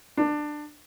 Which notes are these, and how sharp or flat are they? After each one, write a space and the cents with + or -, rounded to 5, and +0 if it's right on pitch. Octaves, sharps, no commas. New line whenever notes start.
D4 +20